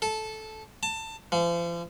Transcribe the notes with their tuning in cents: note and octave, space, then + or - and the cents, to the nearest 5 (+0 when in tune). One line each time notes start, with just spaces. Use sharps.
A4 -10
A5 +20
F3 -40